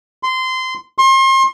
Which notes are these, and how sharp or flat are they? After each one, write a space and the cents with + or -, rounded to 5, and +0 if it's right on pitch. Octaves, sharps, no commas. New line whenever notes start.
C6 -20
C6 +35